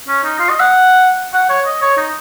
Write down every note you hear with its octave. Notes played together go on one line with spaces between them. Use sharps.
C#4
D#4
F4
D#5
F#5
F#5
C#5
D#5
C#5
D#4